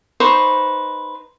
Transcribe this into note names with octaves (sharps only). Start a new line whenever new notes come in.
D#4 B4 C5 C#6